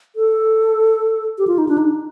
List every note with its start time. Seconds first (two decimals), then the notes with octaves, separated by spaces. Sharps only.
0.16 A4
1.38 G4
1.47 F4
1.58 D#4
1.69 D4
1.78 D#4